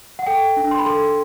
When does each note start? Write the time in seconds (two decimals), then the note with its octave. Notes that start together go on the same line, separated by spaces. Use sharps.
0.19 F#5
0.26 A4 G5
0.57 D4
0.71 C6
0.79 B5
0.86 A4 C6